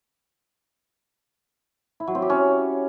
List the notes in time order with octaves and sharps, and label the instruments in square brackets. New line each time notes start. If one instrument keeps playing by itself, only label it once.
[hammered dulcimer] E4
F#3
C4
G4
C#4